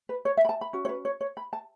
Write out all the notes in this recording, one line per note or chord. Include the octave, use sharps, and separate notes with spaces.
B4
C#5
E5
B5
A5
B5
C#4 F#4
C#5
B4
C#5
C#5
B5
A5